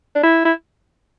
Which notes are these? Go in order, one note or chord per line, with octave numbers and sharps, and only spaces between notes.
D4
E4
E4